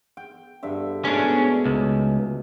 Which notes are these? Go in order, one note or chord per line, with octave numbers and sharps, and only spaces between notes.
G5
G2 D3 E5
G#2 B2 A3 C#4 D4
C#2